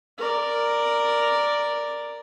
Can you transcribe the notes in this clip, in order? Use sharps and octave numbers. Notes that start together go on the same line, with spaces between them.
A#4 D5